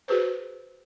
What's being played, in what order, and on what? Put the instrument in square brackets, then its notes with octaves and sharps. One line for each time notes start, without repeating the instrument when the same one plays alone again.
[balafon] F#4 G#4 B4 C5